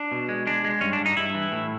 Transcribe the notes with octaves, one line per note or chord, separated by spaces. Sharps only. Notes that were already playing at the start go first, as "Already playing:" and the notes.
Already playing: D4
B2
G#3
G#3 D4
G#3
G2 C#4
D4
G2
D#4
G2 E4
E3
A2